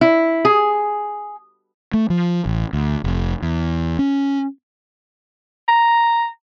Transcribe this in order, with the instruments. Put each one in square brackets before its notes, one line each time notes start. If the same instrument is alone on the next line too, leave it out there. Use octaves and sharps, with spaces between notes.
[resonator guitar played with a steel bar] E4
G#4
[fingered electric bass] A3
F3
A1
D2
F1
E2
C#4
[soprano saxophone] A#5